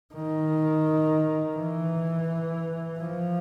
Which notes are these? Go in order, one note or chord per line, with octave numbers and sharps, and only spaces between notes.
D#3
E3
F3